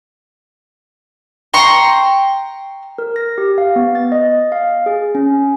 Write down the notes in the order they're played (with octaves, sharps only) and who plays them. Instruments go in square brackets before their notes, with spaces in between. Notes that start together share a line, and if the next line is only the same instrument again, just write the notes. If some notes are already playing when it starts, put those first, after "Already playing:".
[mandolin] G5 A#5 C6 C#6
[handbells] A#4
A#6
G4
F5
B3
A6
D#5
F5
G#4
C#4